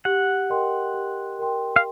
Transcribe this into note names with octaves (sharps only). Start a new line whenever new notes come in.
G4 F#5
A#4 D#5 G5 C6
G4
A#4 D#5 G5 C6
F5